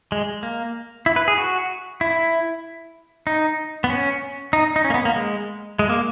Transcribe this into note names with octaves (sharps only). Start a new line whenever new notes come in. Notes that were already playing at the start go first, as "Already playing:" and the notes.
G#3
A#3
E4
B4
G#4
F#4
E4
D#4
B3
C#4
D#4
D#4
C#4
A#3
B3
A#3
G#3
G#3
A#3